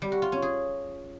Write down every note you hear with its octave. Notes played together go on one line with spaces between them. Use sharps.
G3
F#4
F4
C#4
G#4